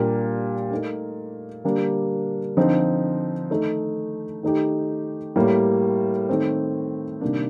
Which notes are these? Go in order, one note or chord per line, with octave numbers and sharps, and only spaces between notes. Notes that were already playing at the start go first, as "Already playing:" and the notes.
Already playing: A#2 G3 D4 G4 A#4
A3 D#4 A#4
D3 G3 A#3 D4
D3 F3 C4 D#4
D#3 A3 D#4
D#3 A3 D#4 G4
A2 G3 A#3
D#3 A3 C4
C3 D#3 G3 A#3 D4